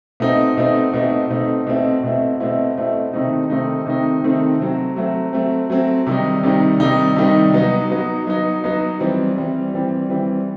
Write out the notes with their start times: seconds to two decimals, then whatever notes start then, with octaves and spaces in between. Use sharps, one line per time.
0.20 B2 A3 C4 D#4
0.57 B2 A3 C4 D#4
0.94 B2 A3 C4 D#4
1.30 B2 A3 C4 D#4
1.67 B2 A3 C4 E4
2.04 B2 A3 C4 E4
2.40 B2 A3 C4 E4
2.77 B2 A3 C4 E4
3.13 C3 D#3 A3 C4 D#4
3.50 C3 D#3 A3 C4 D#4
3.86 C3 D#3 A3 C4 D#4
4.24 C3 D#3 A3 C4 D#4
4.60 F#3 A3 C4
4.96 F#3 A3 C4
5.33 F#3 A3 C4
5.70 F#3 A3 C4
6.07 C3 D#3 G3 D#4
6.43 C3 D#3 G3 D#4
6.80 C3 D#3 G3 D#4
7.16 C3 D#3 G3 D#4
7.53 F#3 B3 D#4
7.90 F#3 B3 D#4
8.27 F#3 B3 D#4
8.64 F#3 B3 D#4
9.00 E3 G3 C4
9.37 E3 G3 C4
9.74 E3 G3 C4
10.10 E3 G3 C4